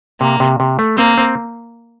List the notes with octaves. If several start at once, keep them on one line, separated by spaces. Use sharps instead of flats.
C3 A#3
C3
C3
A3
A#3 C4
C4